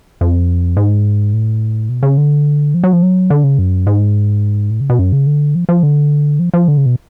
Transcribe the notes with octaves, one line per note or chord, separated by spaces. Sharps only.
F2
G#2
A2
B2
C#3
D3
F3
F#3
F3
F#3
D3
C#3
F#2
G#2
A2
C#3
B2
F#2
C#3
D3
F3
F3
D3
F3
F3
D3
C#3
B2